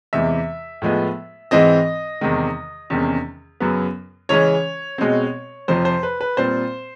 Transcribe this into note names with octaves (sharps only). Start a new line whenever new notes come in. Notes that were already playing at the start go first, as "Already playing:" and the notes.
E2 C3 E3 G#3 E5
A2 F3 G#3 B3
G#2 E3 G#3 C4 D#5
E2 C3 D#3 G#3
E2 C3 D#3 G#3 C#4
F#2 C#3 F#3 B3
C#3 E3 G#3 C#4 C#5
B2 G#3 C4
F2 C3 F3 C5
C5
B4
B4
A#2 G3 C4 C5